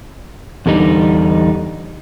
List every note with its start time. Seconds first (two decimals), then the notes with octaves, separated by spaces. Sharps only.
0.66 E2 D3 G3 D#4